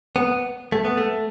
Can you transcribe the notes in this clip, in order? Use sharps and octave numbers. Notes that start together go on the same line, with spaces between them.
B3
A3
B3
A3